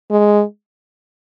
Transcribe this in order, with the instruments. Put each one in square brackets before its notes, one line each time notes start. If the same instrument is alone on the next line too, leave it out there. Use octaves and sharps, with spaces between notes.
[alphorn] G#3